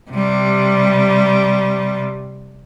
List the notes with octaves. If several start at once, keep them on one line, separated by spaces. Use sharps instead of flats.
C3 G3